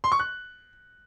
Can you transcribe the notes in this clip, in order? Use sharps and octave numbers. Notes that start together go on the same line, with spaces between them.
C6
C#6
F#6